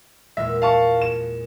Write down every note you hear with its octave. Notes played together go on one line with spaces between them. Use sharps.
E2 A#2 G#3 E5
F5 A5 C#6
E7